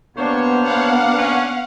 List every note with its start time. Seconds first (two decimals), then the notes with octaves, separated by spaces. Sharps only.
0.17 C3 A#3 B3 D4 C5 C#5
0.62 F5 F#5
1.18 C#4